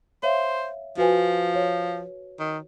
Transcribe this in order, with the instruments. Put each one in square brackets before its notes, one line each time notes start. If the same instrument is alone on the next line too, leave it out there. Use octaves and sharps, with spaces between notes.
[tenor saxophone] C5 [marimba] C#5 E5 F5
[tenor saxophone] F3 [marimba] F#4 B4 G#5
[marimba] F#4 C#5
[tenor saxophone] D#3